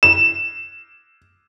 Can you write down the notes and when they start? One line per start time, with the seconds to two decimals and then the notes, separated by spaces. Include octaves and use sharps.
0.03 E7